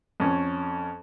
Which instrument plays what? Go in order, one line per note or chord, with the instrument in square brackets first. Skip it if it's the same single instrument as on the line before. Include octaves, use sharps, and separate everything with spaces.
[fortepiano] F2 C#4